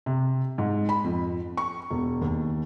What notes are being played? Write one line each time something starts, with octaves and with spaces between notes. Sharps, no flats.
C3
G#2
B5
F2
C#6
E1
D#2